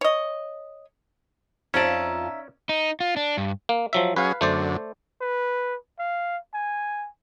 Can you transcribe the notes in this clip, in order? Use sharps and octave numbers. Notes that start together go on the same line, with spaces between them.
C#5 D#5
F2 C#4 D#4 F4 D5 E5 F5 A5
D#4
F4
D4
G2
A#3
F3 F#3 E5
F#3 C#4 G#4 B4 F5
F#2 D3 A3 C5 D5
B4
F5
G#5